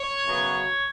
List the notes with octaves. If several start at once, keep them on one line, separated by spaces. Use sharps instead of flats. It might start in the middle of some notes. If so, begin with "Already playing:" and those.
Already playing: C#5
F#2 C#3 F#3 B3